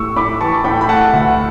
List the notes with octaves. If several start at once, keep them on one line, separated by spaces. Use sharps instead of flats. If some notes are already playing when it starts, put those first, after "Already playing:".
Already playing: A2 A3 C#6 E6
A2 B5 D6
E3 A5 C#6
A2 G5 B5
B5
A3 F#5 A5
D2